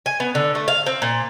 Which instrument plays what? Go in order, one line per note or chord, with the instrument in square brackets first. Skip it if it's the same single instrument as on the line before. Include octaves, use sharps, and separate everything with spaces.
[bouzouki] G#5
B3
D3
A3
F5
C4
A#2